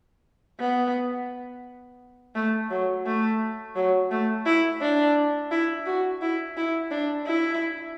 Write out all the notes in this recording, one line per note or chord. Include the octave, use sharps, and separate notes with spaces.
B3
A3
F#3
A3
F#3
A3
E4
D4
E4
F#4
E4
E4
D4
E4